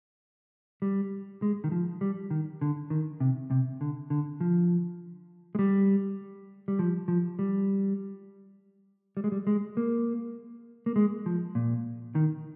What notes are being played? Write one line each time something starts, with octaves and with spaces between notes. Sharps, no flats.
G3
G#3
D#3
F3
G3
D#3
D3
D#3
C3
C3
D3
D3
F3
G#3
G3
G3
F3
F3
G3
G3
G#3
G3
G#3
A#3
A#3
G#3
F3
A#2
D#3